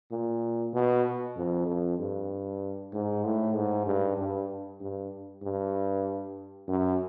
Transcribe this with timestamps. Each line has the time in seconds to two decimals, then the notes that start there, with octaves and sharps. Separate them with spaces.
0.11 A#2
0.73 B2
1.37 F2
1.67 F2
1.99 G2
2.93 G#2
3.24 A2
3.55 G#2
3.86 G2
4.18 G2
4.81 G2
5.43 G2
6.68 F#2